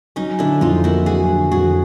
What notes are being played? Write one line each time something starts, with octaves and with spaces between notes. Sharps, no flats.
F#3 C#4 D#4
D3 D4 E4
F2 D#4 F4
A#3 E4 F#4
F#3 F#4 G#4
D3
F2 F#4 G#4